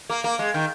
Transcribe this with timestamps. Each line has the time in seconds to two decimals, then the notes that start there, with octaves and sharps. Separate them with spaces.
0.10 A#3
0.24 A#3
0.39 G#3
0.54 D#3